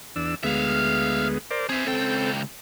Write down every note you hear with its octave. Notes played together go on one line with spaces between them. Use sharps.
E2 D4 E6
D2 G#3 B3 E5 F5
A#4 C5 D5
C4 G#4 E5
C#2 C4 A4 G5